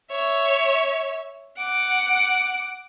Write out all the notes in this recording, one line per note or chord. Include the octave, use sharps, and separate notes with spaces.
C#5 E5
F#5 D6